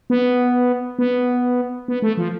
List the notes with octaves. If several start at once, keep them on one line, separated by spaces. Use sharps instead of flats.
B3
B3
B3
A3
F3